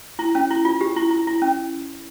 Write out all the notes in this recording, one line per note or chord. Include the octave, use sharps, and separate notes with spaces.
E4
C#4
E4
F4
G4
E4
E4
E4
C#4